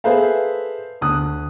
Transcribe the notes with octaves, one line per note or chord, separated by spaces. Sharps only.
G#4 A4 B4 C5 E5 F5
D2 D#6 F#6